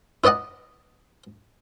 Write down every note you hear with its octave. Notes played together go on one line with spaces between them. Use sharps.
E4 B4 D5 D#5 F#5